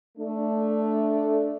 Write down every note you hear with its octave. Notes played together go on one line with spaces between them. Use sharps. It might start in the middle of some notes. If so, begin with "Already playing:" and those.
A3 D4